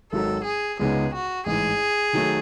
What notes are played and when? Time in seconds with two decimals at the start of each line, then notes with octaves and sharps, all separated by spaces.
0.12 G#1 G#2 F#3 A4
0.45 G#4
0.80 C#2 C#3 G#3 B3 D#4 G#4
1.14 F#4
1.46 A1 G#2 E3 G#4
2.13 D#3 F#3 A3